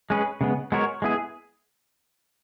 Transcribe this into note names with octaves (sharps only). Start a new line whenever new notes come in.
G#3 C#4 G#4 B4
C#3 G#3 B3
G#3 B3 F#4 A#4 C#5
G#3 B3 E4 G#4